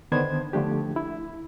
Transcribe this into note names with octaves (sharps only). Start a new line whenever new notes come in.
D3 D#3 B3 D4 C5 G#6
D3 F3 A3 D4 G4
E4